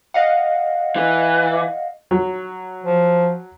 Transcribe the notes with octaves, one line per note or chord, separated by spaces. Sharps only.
D#5 F5 F#5
E3
F#3
F3